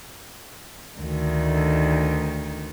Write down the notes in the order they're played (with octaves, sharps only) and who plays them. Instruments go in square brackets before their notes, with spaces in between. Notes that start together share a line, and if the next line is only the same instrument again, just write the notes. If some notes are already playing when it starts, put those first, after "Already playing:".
[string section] D2 D#3